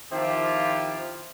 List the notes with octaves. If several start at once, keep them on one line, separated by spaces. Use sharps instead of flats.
D#3 F3 C4 E4 F4 G4